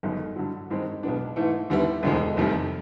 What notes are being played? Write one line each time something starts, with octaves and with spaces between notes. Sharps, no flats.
G1 F#2 D#3 G#3
G2 D3 F#3
G2 D#3 G#3 C4
B1 B2 G#3 B3 D4
G#2 E3 A3
D#2 D3 G3 B3 E4
E1 D2 D3 F3 G#3
F1 F2 C3 D#3 G3